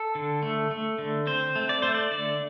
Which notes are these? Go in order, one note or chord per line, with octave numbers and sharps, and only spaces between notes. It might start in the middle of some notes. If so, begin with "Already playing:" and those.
Already playing: A4
D3
A3
A3
D3
C4 C5
A3
D5
A3 C5
D5
D3 D5